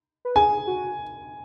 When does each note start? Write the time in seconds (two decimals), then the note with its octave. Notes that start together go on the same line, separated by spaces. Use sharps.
0.25 B4
0.36 G#4 G#5
0.67 F#4